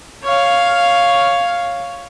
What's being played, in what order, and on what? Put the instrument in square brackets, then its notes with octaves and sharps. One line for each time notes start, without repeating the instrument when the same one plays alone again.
[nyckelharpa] C#5 F5